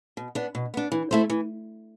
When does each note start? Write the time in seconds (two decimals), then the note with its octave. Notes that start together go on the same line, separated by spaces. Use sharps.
0.17 B2
0.35 B3 D4
0.55 B2
0.74 B3 D4
0.92 E3
1.11 A3 E4 A4 C5
1.30 E3